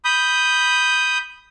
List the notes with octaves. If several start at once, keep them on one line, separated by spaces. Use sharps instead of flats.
B5 D#6 G6